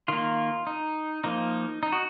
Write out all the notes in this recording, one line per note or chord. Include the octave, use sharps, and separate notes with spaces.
D#3 A#3 F4
D#4
F3 A#3 D#4
D#4
F#4